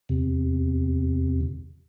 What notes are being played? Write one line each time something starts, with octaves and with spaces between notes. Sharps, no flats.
E2 C3